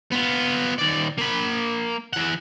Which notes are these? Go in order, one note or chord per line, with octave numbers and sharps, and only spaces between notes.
B3 F4
D#2 D5
A#3 B5
E3 F#5